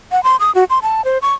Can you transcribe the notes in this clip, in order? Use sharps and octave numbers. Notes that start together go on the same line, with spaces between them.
F#5
C6
D#6
F#4
C6
A5
C5
C#6